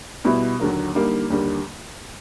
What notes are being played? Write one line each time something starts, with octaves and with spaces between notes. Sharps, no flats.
B2 G3 B3 E4
D#2 D3 F#3 A#3
D3 G3 A#3 D#4
D#2 D3 G3 A#3